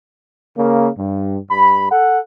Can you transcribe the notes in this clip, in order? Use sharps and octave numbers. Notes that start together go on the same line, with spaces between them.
C#3 A#3
G2
G2 B5
A4 F#5